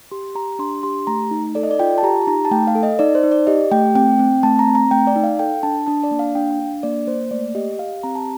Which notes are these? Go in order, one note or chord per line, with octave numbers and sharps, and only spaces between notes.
G4 C6
G4 A#5
D4 C6
G4 C6
A3 A#5
D#4
A4 D5
D#5
D5
F4 G5
A5
G4 A#5
D#4 A#5
A5
A3 G5
F5
A4
D#5
D#4 D5
C5
D#4
D5
G4 D#5
A3 G5
C4 G5
C4
A3 A5
A#5
C4
A#5
A3 G5
D5
D#4
F5
A4 G5
D4 A5
D4 A5
D5
A#3
F5
D4 G5
F5
D4
A#3 D5
A#3 C5
A3 D5
G4 D#5
G4 F5
C4 A#5
A5